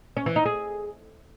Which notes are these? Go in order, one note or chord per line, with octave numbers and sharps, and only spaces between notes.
C#4
E3
D#4
G#4